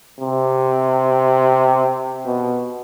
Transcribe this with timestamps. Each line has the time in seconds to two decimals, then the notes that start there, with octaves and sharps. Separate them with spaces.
0.20 C3
2.26 B2